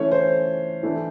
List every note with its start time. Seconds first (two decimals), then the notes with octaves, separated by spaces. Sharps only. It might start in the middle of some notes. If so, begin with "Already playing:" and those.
Already playing: E3 A3 C#4 C#5
0.11 C5
0.83 E3 A3 D4